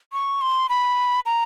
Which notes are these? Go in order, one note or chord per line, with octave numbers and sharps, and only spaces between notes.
C#6
C6
B5
A#5